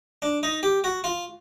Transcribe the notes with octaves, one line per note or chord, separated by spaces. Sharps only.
D4
D#4
G4
F#4
F4